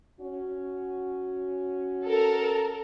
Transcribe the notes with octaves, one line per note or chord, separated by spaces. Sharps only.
C#4 F#4
A4 A#4